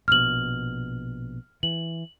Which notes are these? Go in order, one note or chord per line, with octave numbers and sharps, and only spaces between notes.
A#1 B2 F6 F#7
E3 F#7